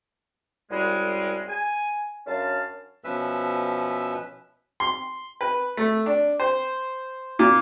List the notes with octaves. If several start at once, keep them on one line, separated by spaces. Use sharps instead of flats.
C2 F#2 G3 G#3
G#5
F#2 C#4 D4 F5 A5
B2 F3 C#4 B4 E5 E6
C6
B4
A3
D4
C5
A#2